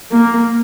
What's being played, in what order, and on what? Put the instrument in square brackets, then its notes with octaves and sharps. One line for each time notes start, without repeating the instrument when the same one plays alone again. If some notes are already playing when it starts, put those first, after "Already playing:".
[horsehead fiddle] A#3